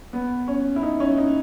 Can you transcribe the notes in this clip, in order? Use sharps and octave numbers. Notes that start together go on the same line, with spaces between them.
B3
C#4
E4
D#4
C#4
D#4